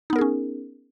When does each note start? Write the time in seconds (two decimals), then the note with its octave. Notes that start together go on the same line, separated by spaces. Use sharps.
0.10 D#4
0.13 B3
0.16 A#4
0.19 G#4
0.21 C#4